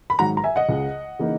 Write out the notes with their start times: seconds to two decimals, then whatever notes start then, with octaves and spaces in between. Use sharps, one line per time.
0.10 B5
0.19 G#2 D#3 F#3 F#5 A#5
0.37 A#5
0.44 E5 G#5
0.56 D#5 F#5
0.68 C#2 C#3 G#3
1.19 C#3 E3 A#3 D#4